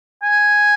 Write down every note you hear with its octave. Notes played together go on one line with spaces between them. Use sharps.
G#5